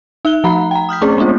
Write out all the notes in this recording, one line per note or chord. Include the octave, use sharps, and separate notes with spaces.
D#4 E5 F#6 G7
F3 A3 A#5 B5
G5 A#5
D#6 F6 G6 B6
A3 C4 C#4 G#4 C5
G#3 B3 C4 D4 F4